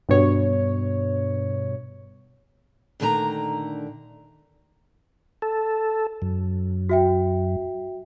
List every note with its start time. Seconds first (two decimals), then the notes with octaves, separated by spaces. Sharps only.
0.09 G2 B2 C#5
3.00 A#2 D3 D#3 A3 G#5 A#5
5.42 A4
6.22 F#2
6.89 F#4 E5 G5